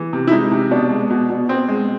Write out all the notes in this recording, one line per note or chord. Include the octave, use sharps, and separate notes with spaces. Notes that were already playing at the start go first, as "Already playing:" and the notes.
Already playing: E3
C3
E4
G#3 D#4
C3
B2 D4
G#3
B2
B2
B2 C4
G#3